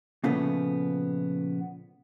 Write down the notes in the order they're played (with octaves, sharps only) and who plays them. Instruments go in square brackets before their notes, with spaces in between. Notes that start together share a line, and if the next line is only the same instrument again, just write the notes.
[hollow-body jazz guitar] A#2 C#3 F3 A3 B3